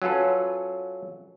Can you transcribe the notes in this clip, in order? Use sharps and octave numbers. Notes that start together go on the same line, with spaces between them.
F#3 C#4 F4 A4 B4